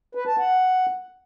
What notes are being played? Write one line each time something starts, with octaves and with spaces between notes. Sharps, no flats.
B4
A5
F#5